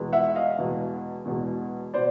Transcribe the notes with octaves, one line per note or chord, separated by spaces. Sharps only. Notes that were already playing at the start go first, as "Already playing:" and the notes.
Already playing: E2 B2 G#3
E5 F#5
D#5 F5
E2 B2 G#3
E2 B2 G#3
B2 C5 D5